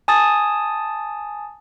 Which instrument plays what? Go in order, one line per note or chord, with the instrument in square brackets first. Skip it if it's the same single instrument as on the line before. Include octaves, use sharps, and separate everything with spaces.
[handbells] G#5 A5 D#6 A6